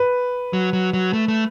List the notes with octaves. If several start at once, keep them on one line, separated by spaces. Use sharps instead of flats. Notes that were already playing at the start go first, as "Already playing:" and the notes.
Already playing: B4
F#3
F#3
F#3
A3
A3